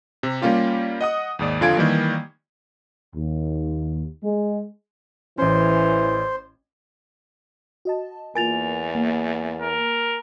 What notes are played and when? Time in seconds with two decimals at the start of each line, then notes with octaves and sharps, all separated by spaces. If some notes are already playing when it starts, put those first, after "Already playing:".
0.23 C3
0.42 G3 A#3 C#4 F4 G4
1.01 D#5 F#5 D#6
1.39 D#2 G#2 D5
1.61 F2 D3 F4 G#5 G#6 D7
1.77 D#3 E3 G3 A#3
3.15 D#2
4.24 G#3
5.38 A1 E3 C#4 C5
7.85 F#4 D#5 A5
8.35 E2 A#3 F4 A#4 G#5 A6 F7
8.95 A#3
9.62 A#4